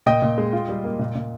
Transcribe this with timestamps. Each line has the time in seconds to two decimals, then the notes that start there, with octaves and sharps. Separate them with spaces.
0.06 A#2 D#5 G5
0.22 A#2
0.38 G#3
0.53 F4
0.69 G3
0.84 A#3
0.99 A#2
1.15 A#2